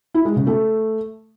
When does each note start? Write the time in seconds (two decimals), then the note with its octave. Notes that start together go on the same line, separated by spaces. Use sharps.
0.14 E4
0.25 G#3
0.36 C#3
0.47 A3